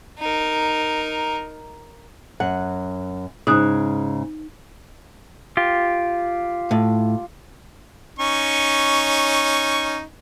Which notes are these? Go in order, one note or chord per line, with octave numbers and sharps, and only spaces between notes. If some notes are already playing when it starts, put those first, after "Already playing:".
D#4 A#4
F#2 F#5
G#2 C#3 D#4 D#6 F#6
F4 G4
A2
C#4 D#4 C#6